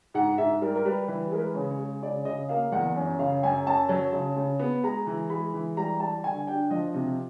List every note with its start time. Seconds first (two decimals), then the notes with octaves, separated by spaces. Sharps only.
0.14 G#2 F#5
0.38 G#2 E5
0.62 G3 A#4
0.76 A#4
0.85 G3 B4
1.08 E3 B4
1.32 G#3 A#4
1.39 B4
1.55 C#3
1.71 C#5
1.79 G#3
2.03 C#3 D5
2.25 C#3 D#5
2.49 A#3 F5
2.72 E2 F#5
2.96 F#2
3.19 C#3 F5
3.43 F#2 G#5
3.66 F#2 A5
3.89 F#3
4.13 C#3
4.37 C#3
4.59 B3
4.84 G#3 A#5
5.07 E3
5.30 G#3 B5
5.53 E3
5.77 G3 A#5
6.00 G3 A5
6.24 D3 G#5
6.47 D4 G5
6.71 F3 D#5
6.94 C3